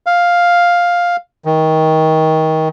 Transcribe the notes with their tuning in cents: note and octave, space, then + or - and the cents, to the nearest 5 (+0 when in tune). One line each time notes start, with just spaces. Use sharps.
F5 +5
D#3 +25